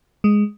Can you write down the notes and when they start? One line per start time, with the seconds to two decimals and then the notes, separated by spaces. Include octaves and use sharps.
0.24 G#3